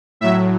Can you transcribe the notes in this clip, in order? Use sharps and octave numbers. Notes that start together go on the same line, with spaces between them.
A2 F#3 E5